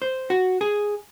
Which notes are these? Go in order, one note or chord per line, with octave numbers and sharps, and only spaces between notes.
C5
F#4
G#4